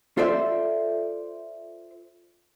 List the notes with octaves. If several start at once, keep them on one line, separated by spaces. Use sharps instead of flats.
F4 A4 C5 D5 E5